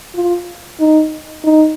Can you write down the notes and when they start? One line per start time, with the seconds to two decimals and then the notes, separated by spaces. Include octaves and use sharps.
0.15 F4
0.80 D#4
1.44 D#4